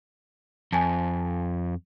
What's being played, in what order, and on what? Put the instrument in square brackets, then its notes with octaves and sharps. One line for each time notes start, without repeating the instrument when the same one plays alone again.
[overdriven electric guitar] F2 [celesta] G#5 A5